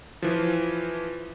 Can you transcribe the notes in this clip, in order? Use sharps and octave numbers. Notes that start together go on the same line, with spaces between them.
E3 F3